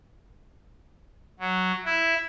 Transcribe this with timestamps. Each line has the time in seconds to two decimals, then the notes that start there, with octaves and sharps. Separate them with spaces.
1.39 F#3
1.85 E4